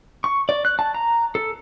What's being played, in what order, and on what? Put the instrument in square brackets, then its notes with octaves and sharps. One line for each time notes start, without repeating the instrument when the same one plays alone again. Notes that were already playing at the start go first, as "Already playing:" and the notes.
[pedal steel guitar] C#6
D5
F#6
A5
A#5
A4